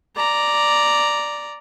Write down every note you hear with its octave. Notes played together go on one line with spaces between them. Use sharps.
D5 A#5